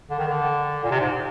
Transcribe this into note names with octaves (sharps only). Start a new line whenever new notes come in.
D3
D#3
D3
A#2
C3
G#2